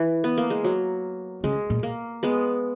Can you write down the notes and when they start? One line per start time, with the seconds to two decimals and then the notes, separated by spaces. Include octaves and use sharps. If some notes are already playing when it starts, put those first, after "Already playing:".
Already playing: E3
0.24 B3
0.38 A#3
0.50 G#3
0.64 F#3
1.44 C#3 G#3
1.70 A#2
1.83 A#3
2.23 G#3 B3